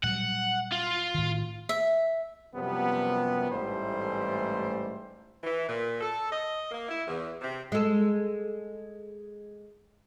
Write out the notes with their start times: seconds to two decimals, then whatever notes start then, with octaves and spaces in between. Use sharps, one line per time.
0.03 A#2 F#3 G3 F#5
0.72 F4
1.14 A2 D#3
1.69 E5
2.55 F#2 C3 F3 G3 B3
3.51 A1 G#2 E3 G3 A3 C5
5.44 E3
5.69 A#2
6.01 A4
6.32 D#5
6.71 A#3
6.89 E4
7.08 E2
7.41 C3
7.72 G#3 A4